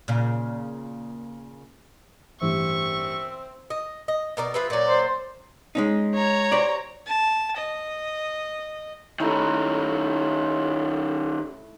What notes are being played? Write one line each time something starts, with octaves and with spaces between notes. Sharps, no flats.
A#2 C#3
A1 G2 C4 E5 C#6
D#5
D#5
B2 A#4 D5
F3 F4 B4 E5
A#2 F#3 D5
C5
G#3 C#4 D#4
C#5 A#5
G4 C5 D5
A5
D#5
D#3 A3 C#4 E4 A#5